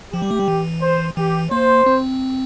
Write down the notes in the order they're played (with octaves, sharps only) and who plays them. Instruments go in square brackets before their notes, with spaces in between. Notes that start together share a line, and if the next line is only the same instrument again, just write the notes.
[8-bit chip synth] F3 [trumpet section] G4
[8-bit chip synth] G3
A3
G3
E3
[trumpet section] C5
[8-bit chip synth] E3 [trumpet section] G4
[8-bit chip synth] A#3 [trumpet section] C5
[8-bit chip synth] C4